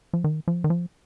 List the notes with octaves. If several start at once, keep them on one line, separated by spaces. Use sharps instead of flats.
F3
D#3
F3
D#3
F3